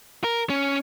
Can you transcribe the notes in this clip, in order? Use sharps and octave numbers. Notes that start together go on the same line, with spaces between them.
A#4
C#4